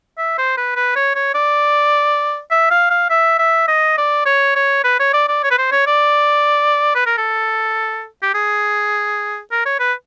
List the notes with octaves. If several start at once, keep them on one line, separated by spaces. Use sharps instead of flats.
E5
C5
B4
B4
C#5
C#5
D5
E5
F5
F5
E5
E5
D#5
D5
C#5
C#5
B4
C#5
D5
D5
C#5
B4
C5
C#5
D5
B4
A#4
A4
G4
G#4
A#4
C#5
B4